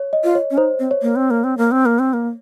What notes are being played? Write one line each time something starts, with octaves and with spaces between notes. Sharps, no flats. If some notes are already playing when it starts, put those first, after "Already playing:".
Already playing: C#5
D#5
F4
C#5
C#4
D#4 C5
C4
C#5
A#3
C4
A#3
C4
A#3
C4
A#3
C4
A#3